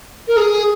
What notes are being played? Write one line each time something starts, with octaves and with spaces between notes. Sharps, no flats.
A#4
G#4